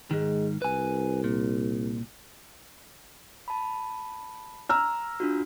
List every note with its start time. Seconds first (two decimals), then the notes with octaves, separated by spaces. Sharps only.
0.11 G#2 D#3 G#3
0.62 C2 B4 G#5
1.24 A#2
3.48 A5 B5
4.69 A#5 E6 F6
5.20 D4 F4 F#4